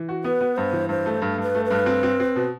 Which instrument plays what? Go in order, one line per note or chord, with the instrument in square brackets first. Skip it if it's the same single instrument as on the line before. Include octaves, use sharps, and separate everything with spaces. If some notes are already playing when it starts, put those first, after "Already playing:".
Already playing: [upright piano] E3
F#4
[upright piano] B3 [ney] B4
[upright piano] B3
[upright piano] G2 [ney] C5
[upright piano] E3
[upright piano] G2 [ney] C5
[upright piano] A3
G2
G2
[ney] B4
[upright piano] A3
[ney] B4
[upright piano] G2
C4
C4
C4
B2